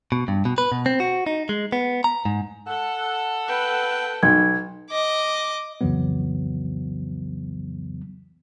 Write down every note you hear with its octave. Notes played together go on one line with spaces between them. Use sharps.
B2
G2
B2
B4
B2
C4
F#4
D#4
G#3
B3
A#5
G#2
A4 F#5
B4 G5
B1 G#6
D#5 D6
C2 F2 C#3 E3 F#3 B3